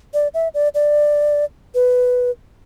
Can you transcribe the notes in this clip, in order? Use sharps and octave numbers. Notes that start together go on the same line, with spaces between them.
D5
E5
D5
D5
B4